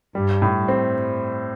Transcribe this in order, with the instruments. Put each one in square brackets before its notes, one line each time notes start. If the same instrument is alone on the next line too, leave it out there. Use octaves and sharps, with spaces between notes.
[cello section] G2 [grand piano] G3
[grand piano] A2
C4